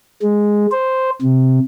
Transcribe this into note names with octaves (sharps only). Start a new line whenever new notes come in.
G#3
C5
C3